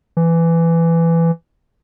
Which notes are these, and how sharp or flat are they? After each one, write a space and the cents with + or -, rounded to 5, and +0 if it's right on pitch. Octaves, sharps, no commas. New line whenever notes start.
E3 +15